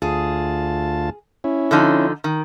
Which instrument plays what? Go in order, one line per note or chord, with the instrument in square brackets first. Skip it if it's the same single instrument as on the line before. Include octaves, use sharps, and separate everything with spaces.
[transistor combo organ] D2 F4 A5 [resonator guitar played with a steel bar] G#4
[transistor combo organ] C#4 E4
[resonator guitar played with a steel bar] D3 F3 D#4
D#3